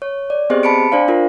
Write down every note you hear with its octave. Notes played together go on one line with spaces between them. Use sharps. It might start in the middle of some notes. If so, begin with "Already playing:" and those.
C#5
D5
B3 C4 G4 G#4 C5 D#5
A5 B5 C#7 D7
D4 C5 D5 F5
D4 F4 A#4